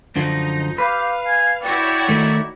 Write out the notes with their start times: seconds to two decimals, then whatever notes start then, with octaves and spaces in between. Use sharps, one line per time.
0.16 F#2 D3 F3 D#4
0.78 G4 B4 F5
1.26 G#5
1.63 E4 F#4 C#5 D5 G5
2.09 D#3 A3 D#4